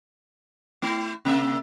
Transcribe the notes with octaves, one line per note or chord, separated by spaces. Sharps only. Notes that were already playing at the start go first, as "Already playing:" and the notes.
A3 E4
C3 A#3 E5